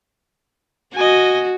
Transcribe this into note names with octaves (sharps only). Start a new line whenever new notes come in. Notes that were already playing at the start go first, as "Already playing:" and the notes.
F#4 D#5 G#5